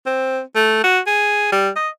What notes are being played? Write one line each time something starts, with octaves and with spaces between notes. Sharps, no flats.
C4
A3
F#4
G#4
G3
D#5